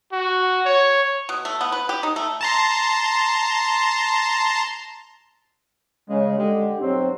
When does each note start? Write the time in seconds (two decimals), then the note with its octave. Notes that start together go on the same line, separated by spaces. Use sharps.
0.12 F#4
0.66 C#5
1.29 B2
1.45 A3
1.61 B3
1.72 B4
1.89 G4
2.03 D#4
2.16 A3
2.41 A5 A#5 C6
6.09 C#3 G#3
6.39 D3 G#3 G4
6.80 B1 G2 F#3 C4